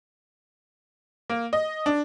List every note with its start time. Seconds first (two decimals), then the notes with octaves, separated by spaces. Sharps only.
1.30 A#3
1.53 D#5
1.86 D4